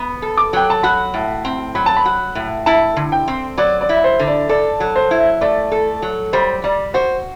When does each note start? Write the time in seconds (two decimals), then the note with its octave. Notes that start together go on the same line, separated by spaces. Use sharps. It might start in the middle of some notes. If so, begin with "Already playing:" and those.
Already playing: B3
0.22 A4
0.37 D6
0.53 F#3 G5
0.70 A5
0.83 F#4 B5
1.14 A2
1.45 C4
1.75 F#3 B5
1.86 A5
1.97 B5
2.05 F#4
2.35 A2
2.66 E4 A5
2.96 D3
3.12 G5
3.28 C4
3.58 F#3 D5
3.81 D5
3.89 E4
4.04 C5
4.19 D3
4.27 D5
4.49 A4 D5
4.80 F#3
4.96 C5
5.11 E4
5.41 A3 D5
5.72 A4
6.02 F#3
6.33 G3 C5
6.64 G3 D5
6.94 F#4 C5